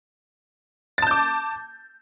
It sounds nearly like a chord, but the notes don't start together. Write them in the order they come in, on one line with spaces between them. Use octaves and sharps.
A6 A5 G6 D6